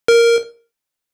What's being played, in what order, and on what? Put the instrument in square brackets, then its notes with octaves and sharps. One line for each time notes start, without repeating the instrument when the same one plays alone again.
[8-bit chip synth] A#4